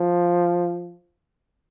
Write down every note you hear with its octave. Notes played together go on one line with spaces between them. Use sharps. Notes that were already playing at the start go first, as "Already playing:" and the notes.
Already playing: F3